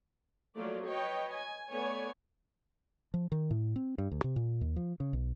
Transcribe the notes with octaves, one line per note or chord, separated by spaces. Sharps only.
F3 F#3 A3 A#3 F4 D5
B4 C#5 D#5 G5
G#5
A3 B3 C#5 D5 G#5
F3
D#3
A2
C4
G2
D2
C3
A#2
D#2
F3
C#3
B1